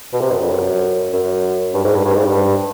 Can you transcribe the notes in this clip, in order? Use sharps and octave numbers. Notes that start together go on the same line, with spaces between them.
B2
C3
F#2
F2
F#2
F#2
G2
G#2
G2
G2
G#2
G2